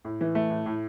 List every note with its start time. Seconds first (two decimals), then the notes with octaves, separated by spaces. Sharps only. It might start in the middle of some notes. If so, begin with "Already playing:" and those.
0.05 A2
0.21 E3
0.35 A3
0.50 A2
0.66 A2